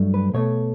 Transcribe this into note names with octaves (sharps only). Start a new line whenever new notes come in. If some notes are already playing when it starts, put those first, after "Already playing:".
Already playing: G2 F#3 A3
B4
B2 A3 C#5